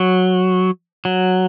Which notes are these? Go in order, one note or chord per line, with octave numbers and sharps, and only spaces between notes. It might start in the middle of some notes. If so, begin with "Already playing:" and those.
Already playing: F#3
F#3